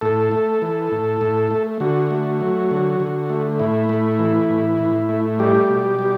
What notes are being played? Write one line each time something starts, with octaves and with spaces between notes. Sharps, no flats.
A2 A4
A3
E3
A2
A2
A3
D3 F#4
A3
F#3
D3
D3
A3
A2 E4
A3
E3
A2
A2
A3
G3 G4
B2
G3